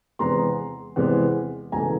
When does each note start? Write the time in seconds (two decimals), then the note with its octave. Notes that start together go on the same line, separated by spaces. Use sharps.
0.19 E2 C3 E3 G#3 B3 A#5 C6
0.96 E2 C3 E3 G#3 B3
1.72 E1 G#5 A#5
1.75 C#3 E3 A3